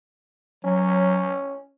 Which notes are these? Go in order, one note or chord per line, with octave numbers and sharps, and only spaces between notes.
F#3 C#4